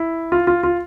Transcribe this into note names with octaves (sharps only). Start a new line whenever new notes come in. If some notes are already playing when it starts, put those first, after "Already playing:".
Already playing: E4
F4
F4
F4